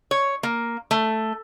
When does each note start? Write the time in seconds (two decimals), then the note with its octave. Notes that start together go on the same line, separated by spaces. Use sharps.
0.11 C#5
0.43 A#3
0.91 A3